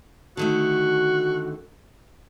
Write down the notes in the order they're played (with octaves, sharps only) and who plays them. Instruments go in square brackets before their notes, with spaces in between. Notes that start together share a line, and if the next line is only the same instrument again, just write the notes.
[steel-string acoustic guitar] D3 D#3 A3 [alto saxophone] F#4